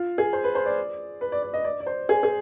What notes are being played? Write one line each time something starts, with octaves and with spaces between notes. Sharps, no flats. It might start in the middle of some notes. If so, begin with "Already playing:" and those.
Already playing: F4
G#4
C5
B4
C5
D5
B4
D5
D5
D#5
D5
D5
C5
G#4
G#4